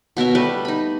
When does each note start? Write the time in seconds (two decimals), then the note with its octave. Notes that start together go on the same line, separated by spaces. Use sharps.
0.17 B2 B3 A#4 E5
0.35 G3 A3 B4
0.65 D#4 B5